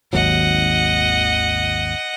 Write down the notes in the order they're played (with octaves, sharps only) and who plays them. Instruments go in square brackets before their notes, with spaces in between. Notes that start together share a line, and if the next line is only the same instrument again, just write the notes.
[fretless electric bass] G#1 D#2 F#3 [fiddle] D#5 F#5